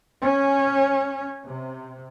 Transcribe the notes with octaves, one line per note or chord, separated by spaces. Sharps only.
C#4
C3